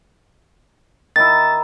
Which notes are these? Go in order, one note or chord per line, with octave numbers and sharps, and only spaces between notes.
D#3 E4 A6